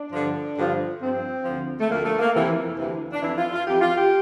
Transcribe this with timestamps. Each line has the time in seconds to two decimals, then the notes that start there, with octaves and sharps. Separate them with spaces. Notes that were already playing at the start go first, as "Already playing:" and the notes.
Already playing: D4
0.12 G2 D3 F3
0.57 G2 D3 F3
1.00 G2 F3 C4
1.44 D2 D3 F3
1.79 A3
1.89 D2 D3 F3 A#3
2.04 A3
2.19 A#3
2.33 F2 C3 E3
2.78 D2 C3 E3
3.13 D4
3.22 F2 E3 E4
3.37 F4
3.52 F4
3.67 F2 E3 G4
3.81 F4
3.95 G4